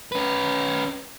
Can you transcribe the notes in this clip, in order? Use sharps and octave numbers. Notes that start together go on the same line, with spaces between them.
C#4 B4